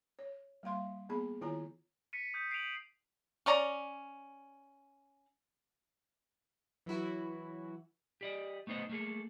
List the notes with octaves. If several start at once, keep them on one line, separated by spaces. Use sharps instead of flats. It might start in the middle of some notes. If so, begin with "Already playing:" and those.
C#5
G3 A#3 F5 C6
A#3 B3 G#4 B5
D#3 E4 F4 C#5 G#5 A#5
B6 C#7 D#7
D#6 G6 B6
C7 D7 D#7 F7 F#7
C#4 D5 A#5
E3 F#3 E4 F#4
G4 D5 D#5
A3 B3 D#4 C5 D#5
A3 A#3 G#4 A4